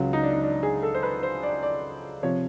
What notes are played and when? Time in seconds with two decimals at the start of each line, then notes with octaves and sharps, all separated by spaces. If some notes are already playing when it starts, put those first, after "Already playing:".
Already playing: C#2 C#3 F#3
0.13 D#4
0.23 D4
0.33 D#4
0.43 D4
0.63 G#4
0.83 A4
0.95 C5
1.03 B4
1.23 C5
1.43 D5
1.63 D5
2.23 C3 F3 C#5